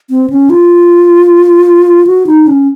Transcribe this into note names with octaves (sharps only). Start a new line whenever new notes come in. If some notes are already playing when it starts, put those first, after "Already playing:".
C4
C#4
F4
F#4
D#4
C#4